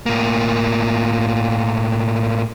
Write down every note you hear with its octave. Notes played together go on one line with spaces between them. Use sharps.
A2 A#3